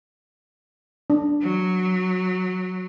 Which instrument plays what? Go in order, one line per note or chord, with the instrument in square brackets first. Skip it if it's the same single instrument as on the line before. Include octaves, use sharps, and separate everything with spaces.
[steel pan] D4
[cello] F#3